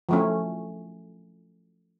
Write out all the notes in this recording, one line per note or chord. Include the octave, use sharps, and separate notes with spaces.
F3 A3 C#4